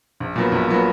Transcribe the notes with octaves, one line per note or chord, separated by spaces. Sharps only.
A#1
A#2 F#3 B3
A#1
A#2 F#3 B3